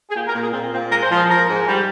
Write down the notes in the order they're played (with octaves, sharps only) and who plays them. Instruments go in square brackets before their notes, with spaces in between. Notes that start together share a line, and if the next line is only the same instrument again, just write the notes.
[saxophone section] G#4
A#2 G4
A#4
A#2
G#4
A#2 C4
A#2 C4
G#3 A#4
C5
F3
G#4
F3 A#4
G#2
G3